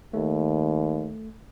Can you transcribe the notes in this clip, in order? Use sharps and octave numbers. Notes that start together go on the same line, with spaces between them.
D#2 A3